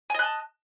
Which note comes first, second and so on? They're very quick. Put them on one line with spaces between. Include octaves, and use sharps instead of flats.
G#5 D#5 F#6 A5